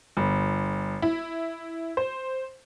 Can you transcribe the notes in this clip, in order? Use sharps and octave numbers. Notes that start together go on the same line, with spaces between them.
G1
E4
C5